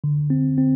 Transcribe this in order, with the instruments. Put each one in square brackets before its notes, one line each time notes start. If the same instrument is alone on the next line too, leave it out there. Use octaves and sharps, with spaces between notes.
[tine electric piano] D3
C4
C4